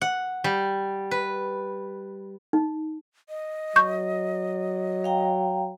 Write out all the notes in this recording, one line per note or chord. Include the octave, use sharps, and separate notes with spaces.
F#5
G3
B4
D#4
D#5
F#3 C#6 G6
F5 G5 A#5